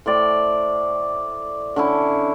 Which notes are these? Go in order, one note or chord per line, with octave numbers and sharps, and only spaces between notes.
A2 C5 D5 G5
D3 C#4 E4